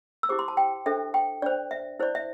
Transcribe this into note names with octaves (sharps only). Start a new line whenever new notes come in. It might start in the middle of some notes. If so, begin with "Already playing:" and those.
E6
E4 G4 C5 D6
C6
A5
G5
D4 A4 C5 E5
G5
D4 C5 D5
E5
E4 C5 D5
E5